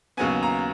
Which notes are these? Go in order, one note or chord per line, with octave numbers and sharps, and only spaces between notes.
D#2 C#3 F#3 B3 G#5
A#5